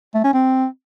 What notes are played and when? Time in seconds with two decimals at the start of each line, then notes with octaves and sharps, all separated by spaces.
0.14 A3
0.24 C#4
0.34 C4